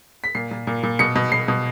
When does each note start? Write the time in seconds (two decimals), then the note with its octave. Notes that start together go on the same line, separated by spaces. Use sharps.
0.24 B6
0.35 A#2 C7
0.51 A#2
0.67 A#2
0.83 A#2
0.99 B2 C#7
1.16 B2
1.32 B2 C7
1.48 B2